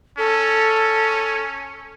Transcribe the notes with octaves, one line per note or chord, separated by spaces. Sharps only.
C#4 A4